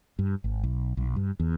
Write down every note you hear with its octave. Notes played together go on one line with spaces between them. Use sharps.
G2
G#1
B1
B1
G2
E2